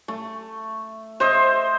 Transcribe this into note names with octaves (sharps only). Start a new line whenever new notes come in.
A3
C5 D#5 E5